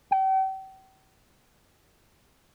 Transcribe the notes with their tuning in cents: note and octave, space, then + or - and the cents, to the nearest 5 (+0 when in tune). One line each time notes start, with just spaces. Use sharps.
G5 -40